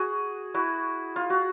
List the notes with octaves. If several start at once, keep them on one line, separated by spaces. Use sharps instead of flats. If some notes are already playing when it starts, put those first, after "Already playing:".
Already playing: F#4 G#4
E4 F#4
F4
F#4